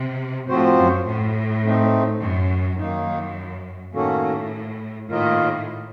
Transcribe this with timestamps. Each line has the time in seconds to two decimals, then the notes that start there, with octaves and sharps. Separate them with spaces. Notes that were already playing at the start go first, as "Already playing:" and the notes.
Already playing: C3
0.48 A2 F3 C4 F#4 C5
0.77 F#2
1.06 A2
1.63 A3 C4 D#4
2.21 F#2
2.78 F#2 D#3 A#3 D#4
3.93 A2 D#3 A#3 C#4 F#4 A4
5.08 A2 D#3 A#3 F4 A#4 D#5